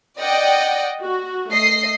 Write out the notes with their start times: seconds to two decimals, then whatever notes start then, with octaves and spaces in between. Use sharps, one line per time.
0.20 D5 D#5 F#5 G5
1.01 F#4
1.52 A3 D#5 C7